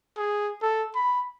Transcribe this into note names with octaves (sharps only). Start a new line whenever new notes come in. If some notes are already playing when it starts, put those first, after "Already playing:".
G#4
A4
B5